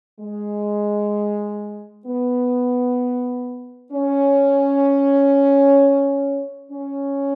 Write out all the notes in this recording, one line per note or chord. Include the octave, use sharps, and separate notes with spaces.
G#3
B3
C#4
C#4